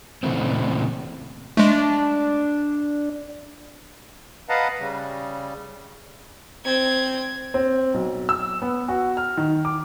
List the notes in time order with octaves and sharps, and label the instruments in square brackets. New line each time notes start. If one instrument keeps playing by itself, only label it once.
[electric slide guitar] A#2 C#3 E3 A3 C4
[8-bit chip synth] G#3 A3 [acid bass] D4
[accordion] B4 D#5 F5 F#5 A5 A#5
C#3 G3
[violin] C4 G#6
[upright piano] C4
B1
E6
B3
F#4
F6
D#3
D6